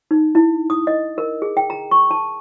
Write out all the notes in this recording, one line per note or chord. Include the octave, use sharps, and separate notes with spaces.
D#4
E4
D#6
D#5
A#4
G#4
G5
A#5
C#6
A5